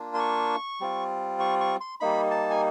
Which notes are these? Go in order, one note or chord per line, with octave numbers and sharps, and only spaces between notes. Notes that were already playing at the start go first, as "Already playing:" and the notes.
Already playing: A#3 D4 F4
C6
C#6
G3 C4 F4
C#6
C#6
C6
G3 A#3 D#4 B5
A5
G#5